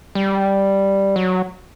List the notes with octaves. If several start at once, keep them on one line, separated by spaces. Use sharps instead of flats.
G3
F#3